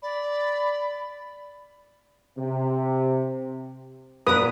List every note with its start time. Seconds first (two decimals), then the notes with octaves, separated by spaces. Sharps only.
0.02 D5 B5
2.38 C3
4.27 A#2 A#4 B4 D#6